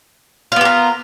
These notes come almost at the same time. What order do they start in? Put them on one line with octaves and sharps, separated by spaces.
F4 B3 G4 A#4